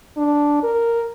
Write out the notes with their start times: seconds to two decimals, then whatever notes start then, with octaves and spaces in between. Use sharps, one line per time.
0.17 D4
0.63 A#4